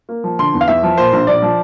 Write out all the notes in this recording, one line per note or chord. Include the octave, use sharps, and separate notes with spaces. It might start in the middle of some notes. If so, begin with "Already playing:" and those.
A#3
F3
D3 C6
E2
F5
E2 E5
F3
A#2 C5
A#1
A#1 D5
F3